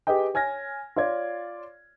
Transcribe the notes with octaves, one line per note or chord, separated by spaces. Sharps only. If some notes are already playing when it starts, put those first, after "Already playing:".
G4 G#4 B4 D#5 G5
C#5 G#5 F6 G#6 A#6
F4 C#5 D5 G#6